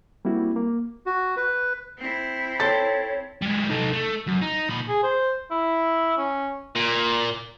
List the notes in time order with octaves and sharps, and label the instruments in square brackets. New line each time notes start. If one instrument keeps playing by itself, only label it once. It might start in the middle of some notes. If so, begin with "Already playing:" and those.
[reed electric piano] G3 A#3 C4 E4 F#4
A#3
[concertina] F#4
B4
[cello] C4 E4
[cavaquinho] A4 G5 C6 [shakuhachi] C#5 [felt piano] A6
[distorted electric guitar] G3 G#3
D#4 A4
A3
F#2
D#4
A#2 B5
[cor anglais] G#4
C5
E4
C#4
[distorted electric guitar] A#2